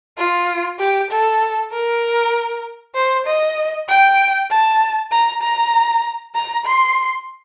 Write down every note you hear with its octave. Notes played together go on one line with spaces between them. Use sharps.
F4
G4
A4
A#4
C5
D#5
G5
A5
A#5
A#5
A#5
C6